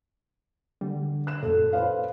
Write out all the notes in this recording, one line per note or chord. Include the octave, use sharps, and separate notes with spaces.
D3 G3
F#6 E7
F#2 A#2 A4
B4 C5 F5